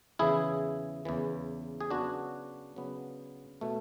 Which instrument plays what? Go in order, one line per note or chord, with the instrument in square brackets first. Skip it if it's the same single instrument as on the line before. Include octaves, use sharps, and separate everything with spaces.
[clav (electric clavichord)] E2 C#3 E3 E4 G#4
E2 C#3 E3
G#4
C#3 F#3 B3 D4 F#4
C#3 F#3 B3
B2 A3